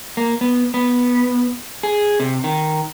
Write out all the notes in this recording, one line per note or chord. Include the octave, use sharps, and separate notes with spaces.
A#3
B3
B3
G#4
C3
D#3